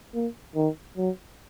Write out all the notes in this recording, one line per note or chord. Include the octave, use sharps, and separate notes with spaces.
A#3
D#3
F#3